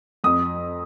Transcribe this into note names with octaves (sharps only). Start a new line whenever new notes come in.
F2 D#6